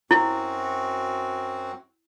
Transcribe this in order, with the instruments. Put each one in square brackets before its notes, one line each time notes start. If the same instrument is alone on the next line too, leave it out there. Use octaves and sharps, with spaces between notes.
[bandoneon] F#2 C4 F#4 [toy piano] E4